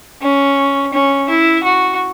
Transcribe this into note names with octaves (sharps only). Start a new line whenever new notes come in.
C#4
C#4
E4
F#4